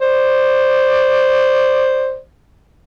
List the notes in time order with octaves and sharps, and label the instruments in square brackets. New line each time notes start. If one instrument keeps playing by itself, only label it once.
[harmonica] C5 D5